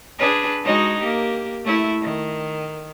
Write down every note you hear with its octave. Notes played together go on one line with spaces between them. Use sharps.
D4 G#4 B4
G#3 D#4 F#4
A#3 G4
A3 E4
D#3